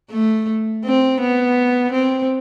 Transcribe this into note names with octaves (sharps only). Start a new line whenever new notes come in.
A3
C4
B3
C4